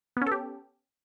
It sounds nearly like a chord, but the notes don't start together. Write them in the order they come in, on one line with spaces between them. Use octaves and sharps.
B3 C#4 A4 G4